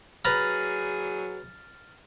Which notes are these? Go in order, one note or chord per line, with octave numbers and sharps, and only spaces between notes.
F#3 G#4 B4 A#5 F6 A6